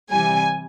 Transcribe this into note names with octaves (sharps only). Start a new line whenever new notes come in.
C3 E3 G3 G#5